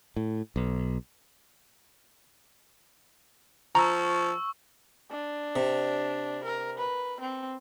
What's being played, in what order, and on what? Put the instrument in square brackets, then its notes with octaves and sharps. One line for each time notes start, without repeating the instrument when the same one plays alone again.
[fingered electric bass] A2
B1
[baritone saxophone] F3 [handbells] A#5 [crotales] C#6 E6
[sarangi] D4
[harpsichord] C3
[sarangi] A#4
B4
C4